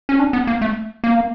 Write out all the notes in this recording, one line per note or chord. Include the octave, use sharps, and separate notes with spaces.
C#4
D4
B3
A#3
A3
A#3